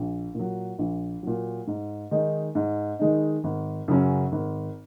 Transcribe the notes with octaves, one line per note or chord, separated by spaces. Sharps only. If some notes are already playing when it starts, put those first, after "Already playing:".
Already playing: A#1
A#2 F#3
A#1
A#2 F#3
G#2
D#3 G#3 D#4
G#2
D#3 G#3 D#4
G#1
F#2 C#3 F#3 C#4
G#1